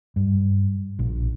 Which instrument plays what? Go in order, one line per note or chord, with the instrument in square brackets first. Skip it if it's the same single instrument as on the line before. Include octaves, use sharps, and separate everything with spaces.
[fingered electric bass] G2
A#1